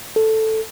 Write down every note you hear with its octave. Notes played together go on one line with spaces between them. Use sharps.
A4